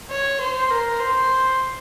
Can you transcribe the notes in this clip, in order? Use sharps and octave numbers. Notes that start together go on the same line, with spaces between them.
C#5
C5
A#4
C5